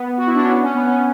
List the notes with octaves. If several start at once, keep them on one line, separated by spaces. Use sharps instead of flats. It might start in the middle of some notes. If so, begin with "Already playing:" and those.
Already playing: B3
F#4
E4
D4
C#4
B3
C#4
B3
C#4